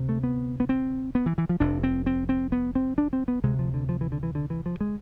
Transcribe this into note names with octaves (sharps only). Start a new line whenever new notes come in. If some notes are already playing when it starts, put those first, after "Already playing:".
Already playing: D2 C3
A3
B3
B3
C4
B3
E3
E3
F3
F1 F2 C3 D4
C4
C4
C4
B3
C4
D4
C4
B3
D2 C3 G#3
F3
D3
F3
E3
D3
E3
D3
E3
F3
G#3